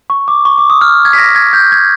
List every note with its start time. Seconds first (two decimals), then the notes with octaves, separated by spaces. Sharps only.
0.10 C#6
0.28 D6
0.45 C#6
0.58 D6
0.70 D#6
0.81 F6
1.05 G#6
1.13 B6
1.18 A#6
1.35 G#6
1.53 G6
1.72 G#6